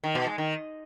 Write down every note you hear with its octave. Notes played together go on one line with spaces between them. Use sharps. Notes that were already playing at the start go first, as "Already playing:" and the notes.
D#3
B2
G#3
D#3